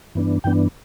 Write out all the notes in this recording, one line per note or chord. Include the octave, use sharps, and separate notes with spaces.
G2 E3 B3 D4
G2 E3 B3 D4 G5